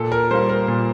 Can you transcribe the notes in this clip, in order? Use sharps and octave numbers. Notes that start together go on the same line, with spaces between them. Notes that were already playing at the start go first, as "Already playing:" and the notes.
Already playing: A#2 A4
A#4
G3 A#3 C5
A#4
A#2